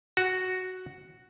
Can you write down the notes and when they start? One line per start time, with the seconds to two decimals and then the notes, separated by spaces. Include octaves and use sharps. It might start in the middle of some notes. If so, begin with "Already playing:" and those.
0.17 F#4